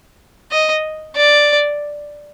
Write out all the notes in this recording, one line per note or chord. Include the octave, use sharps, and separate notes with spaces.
D#5
D5